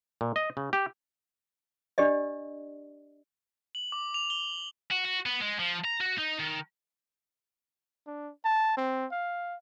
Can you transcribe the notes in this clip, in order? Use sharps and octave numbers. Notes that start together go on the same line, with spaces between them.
A#2
D#5
C#3
G4
D4 G4 D5 D#5
F#7
D6
F7
G7
F#4
F#4
B3
G#3
F3
A#5
F#4
D#4
D#3
D4
A5
C4
F5